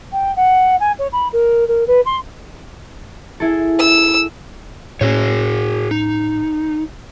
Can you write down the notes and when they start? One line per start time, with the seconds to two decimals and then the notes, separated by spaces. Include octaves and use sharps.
0.12 G5
0.36 F#5
0.80 G#5
0.99 C#5
1.13 B5
1.33 A#4
1.68 A#4
1.87 B4
2.06 C6
3.40 E4 G#4 A4
3.79 E6
5.01 A2 C#4 F#4 G#4 C#5
5.91 D#4